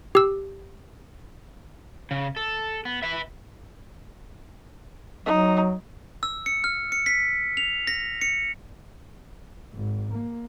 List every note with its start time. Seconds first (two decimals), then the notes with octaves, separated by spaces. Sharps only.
0.15 G4 E6
2.11 C#3
2.36 A4
2.85 B3
3.03 B4 E5
5.26 F#3 D#4
6.23 E6
6.46 C#7
6.64 F6
6.92 C#7
7.06 B6
7.57 F7
7.87 A#6
8.21 C#7
9.74 G#1
10.12 A#3